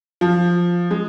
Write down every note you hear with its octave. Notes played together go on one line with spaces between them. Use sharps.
F3
G#3